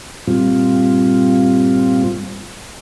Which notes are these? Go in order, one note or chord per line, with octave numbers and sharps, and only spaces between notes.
G2 A#2 G3 C4 F4